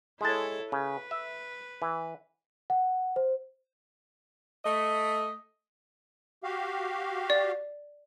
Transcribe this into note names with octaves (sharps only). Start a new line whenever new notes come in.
G#3 E4 A4 C#5 A5
C#3 B4
E5
E3
F#5
C5
A3 D#5
F#4 G4 F5
D5